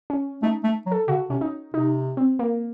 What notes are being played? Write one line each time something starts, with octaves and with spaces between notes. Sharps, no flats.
C#4
A3 D#4
A3
F#3
A4
C#3 F#4
C3 C#4
D#4
C3 D#4
C4
A#3